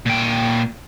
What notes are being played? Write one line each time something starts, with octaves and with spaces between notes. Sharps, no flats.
A#2 G5